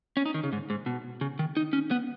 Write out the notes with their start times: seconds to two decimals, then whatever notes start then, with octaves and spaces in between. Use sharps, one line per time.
0.17 C#4
0.25 D#4
0.34 D#3
0.43 C#3
0.53 G#2
0.70 G#2
0.86 B2
1.21 C#3
1.39 D#3
1.57 D#4
1.73 C#4
1.91 B3